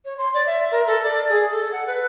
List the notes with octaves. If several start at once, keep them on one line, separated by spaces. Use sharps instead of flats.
C#5
C6
D5
E5
A#4
A4
D5
G#4
A4
F#5
B4